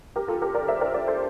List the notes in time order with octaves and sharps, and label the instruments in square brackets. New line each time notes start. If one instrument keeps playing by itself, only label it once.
[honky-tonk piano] G4 A#4
F4 A4
G4 A#4
A#4 D5
C5 E5
A#4 D5
A#4 D5
A4 C5